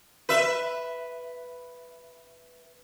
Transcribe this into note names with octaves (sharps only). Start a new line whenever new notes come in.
B4 E5